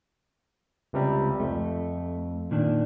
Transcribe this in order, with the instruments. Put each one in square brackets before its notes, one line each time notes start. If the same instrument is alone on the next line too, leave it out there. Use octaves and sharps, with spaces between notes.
[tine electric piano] C#2 C3 G3
[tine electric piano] F2 [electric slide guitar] A3
[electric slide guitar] A#2 D#3 D4